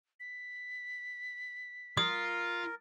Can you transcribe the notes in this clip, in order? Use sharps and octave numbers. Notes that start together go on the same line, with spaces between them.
B6
F4 A#4 D#6